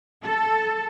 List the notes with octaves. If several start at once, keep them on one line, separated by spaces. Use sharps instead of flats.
A4